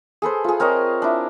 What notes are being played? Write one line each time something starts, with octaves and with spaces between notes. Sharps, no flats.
G#4 A4 B4 C5
F4 G#4
C4 A#4 C#5 D#5
D4 E4